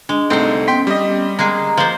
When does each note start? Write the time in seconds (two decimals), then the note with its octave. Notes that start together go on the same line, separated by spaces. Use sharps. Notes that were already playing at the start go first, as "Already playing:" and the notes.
0.09 G#3 D4
0.30 C2 A3 C4 D#4 C5
0.68 B3 C#4 G5 C6 B6
0.87 G3 D#5
1.39 G#3 A#3 G#4 A#5
1.77 F3 A#3 C5